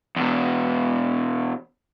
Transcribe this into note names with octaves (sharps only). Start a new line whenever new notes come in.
E2 B2